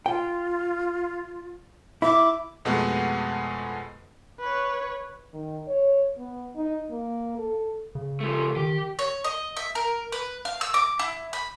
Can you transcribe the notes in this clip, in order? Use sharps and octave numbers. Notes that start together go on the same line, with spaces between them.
F4 G5
E4 E5 D6
F2 B2 G#3 A3 B3 F#5
B4 C#5
D#3
C#5
B3
D#4
A#3
A4
C#3
F3 A3
D#3 G4
C#5
D#5
E5
A#4
B4
F5
E6
D6
E4
B5